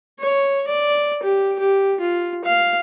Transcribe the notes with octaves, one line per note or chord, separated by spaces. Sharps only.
C#5
D5
G4
G4
F4
F5